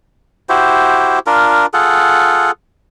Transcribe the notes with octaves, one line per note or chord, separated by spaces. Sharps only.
E4 F#4 G4 C5
D4 F4 A#4
F4 G#4 A4 F#5